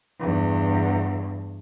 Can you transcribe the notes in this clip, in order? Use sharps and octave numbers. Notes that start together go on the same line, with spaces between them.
E2 G2